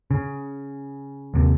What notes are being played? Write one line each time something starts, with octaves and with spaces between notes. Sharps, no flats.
C#3
D#2 C3